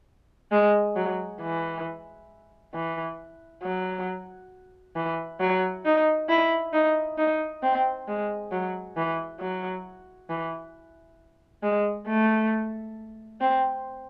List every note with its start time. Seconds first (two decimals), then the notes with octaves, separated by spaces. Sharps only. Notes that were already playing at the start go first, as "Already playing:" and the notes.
0.52 G#3
0.96 F#3
1.41 E3
2.74 E3
3.63 F#3
4.96 E3
5.41 F#3
5.85 D#4
6.29 E4
6.73 D#4
7.18 D#4
7.63 C4
8.08 G#3
8.52 F#3
8.96 E3
9.40 F#3
10.29 E3
11.63 G#3
12.07 A3
13.41 C4